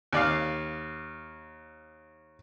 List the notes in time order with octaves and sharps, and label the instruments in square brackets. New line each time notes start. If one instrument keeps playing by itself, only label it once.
[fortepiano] D#2 D5 F5